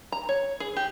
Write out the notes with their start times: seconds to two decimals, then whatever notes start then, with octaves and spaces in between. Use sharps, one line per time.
0.12 A#5
0.29 C#5
0.60 G#4
0.76 G4